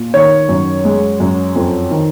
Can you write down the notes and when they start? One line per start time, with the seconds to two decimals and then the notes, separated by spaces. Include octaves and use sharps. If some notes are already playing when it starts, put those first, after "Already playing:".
Already playing: A#2
0.14 D#3 C#5
0.49 F#2
0.85 G#3
1.20 F#2
1.55 F2
1.91 D#3